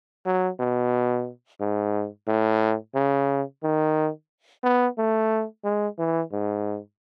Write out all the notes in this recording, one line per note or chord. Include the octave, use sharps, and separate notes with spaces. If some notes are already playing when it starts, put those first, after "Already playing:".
F#3
B2
G#2
A2
C#3
D#3
B3
A3
G#3
E3
G#2